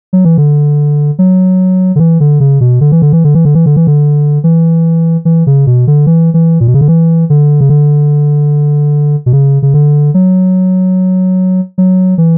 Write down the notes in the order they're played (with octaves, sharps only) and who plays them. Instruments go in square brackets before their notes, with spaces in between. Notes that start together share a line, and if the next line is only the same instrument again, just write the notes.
[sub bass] F#3
E3
D3
F#3
D3
E3
D3
C#3
B2
D3
E3
D3
E3
D3
E3
D3
E3
D3
E3
D3
E3
E3
C#3
B2
D3
E3
E3
A#2
B2
C#3
D3
E3
D3
C#3
D3
B2
C#3
C#3
D3
F#3
F#3
E3